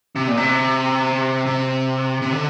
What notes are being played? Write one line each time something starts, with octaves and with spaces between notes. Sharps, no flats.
C3
A#2
C3
C3
C3
D3